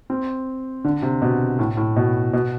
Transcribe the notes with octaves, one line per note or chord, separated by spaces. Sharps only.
C4
D3
C3
B2
A2
A2
B2
B2